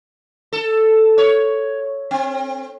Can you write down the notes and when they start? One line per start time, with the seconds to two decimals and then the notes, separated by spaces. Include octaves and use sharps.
0.53 A4
1.18 C#5
2.11 C4